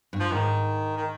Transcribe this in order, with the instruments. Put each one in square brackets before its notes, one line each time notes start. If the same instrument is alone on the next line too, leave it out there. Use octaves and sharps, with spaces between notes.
[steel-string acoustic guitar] G2
[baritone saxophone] F3
[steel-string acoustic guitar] G#2 [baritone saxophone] D#3
[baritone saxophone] D#3